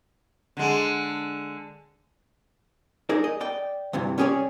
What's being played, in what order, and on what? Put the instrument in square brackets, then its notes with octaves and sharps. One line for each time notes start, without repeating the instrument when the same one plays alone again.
[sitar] D3 G#3
[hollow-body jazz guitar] D#4 G#4 A#4 D5
D#5
D5 G5
D2 G2 C3 E3
C#4 G4 G#4 A#4 C#5 D5